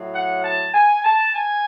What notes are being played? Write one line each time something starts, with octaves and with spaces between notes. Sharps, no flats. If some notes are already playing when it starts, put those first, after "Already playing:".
Already playing: A2 F#3
F#5
A5
G#5
A5
G#5